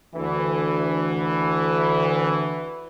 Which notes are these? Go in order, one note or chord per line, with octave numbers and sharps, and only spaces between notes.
D2 E3